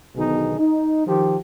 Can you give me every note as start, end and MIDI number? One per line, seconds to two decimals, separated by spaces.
0.16 0.56 35
0.16 0.56 47
0.16 0.56 50
0.16 0.56 51
0.16 0.56 63
0.16 0.56 68
0.58 1.05 63
1.07 1.36 51
1.07 1.36 53
1.07 1.36 67